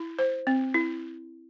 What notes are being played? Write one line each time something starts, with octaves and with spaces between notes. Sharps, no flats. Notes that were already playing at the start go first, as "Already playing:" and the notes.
Already playing: E4
C5
C4
E4